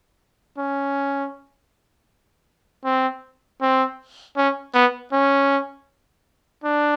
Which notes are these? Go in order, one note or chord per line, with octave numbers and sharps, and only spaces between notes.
C#4
C4
C4
C#4
B3
C#4
D4